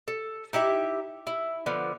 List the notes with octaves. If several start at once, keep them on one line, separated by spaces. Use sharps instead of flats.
A4
D#4 E4 G4 E5
E4
D3 F3 B3